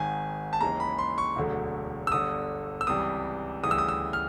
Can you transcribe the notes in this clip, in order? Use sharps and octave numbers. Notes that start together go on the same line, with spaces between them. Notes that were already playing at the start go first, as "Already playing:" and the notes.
Already playing: G#1 G#2 D#3 G#5
A5
D#2 C#3 E3 G#3 A#5
B5
C6
C#6
E1 D2 D3 F#3 A3
E6
G1 G2 D3 D#6
E6
C#2 C3 E3 G3 D#6
D2 C#3 E3 G3 D#6
E6
D#6
E6
F6